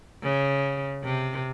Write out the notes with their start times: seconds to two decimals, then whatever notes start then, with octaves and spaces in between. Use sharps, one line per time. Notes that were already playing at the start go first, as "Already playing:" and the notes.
0.23 C#3
1.04 C3